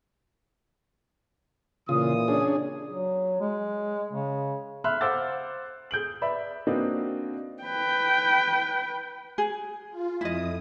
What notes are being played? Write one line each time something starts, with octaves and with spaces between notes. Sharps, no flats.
A#2 C#3 E3 F4 D#6
C#4 D4 G#4
F#3
G#3
C#3
E5 B5 C6 F6 F#6
C5 F5 F#5 D6 E6 A6
G#4 G6 D7 F#7
B4 D5 E5 B5
A#3 C4 D4 D#4 F#4 B4
B4 G5
G#4
F4
F2 E4 D#5 D#6